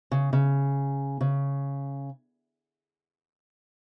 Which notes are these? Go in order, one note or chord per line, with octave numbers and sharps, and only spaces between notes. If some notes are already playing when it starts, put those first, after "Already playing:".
C#3
C#3
C#3